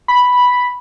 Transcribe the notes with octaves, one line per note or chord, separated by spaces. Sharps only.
B5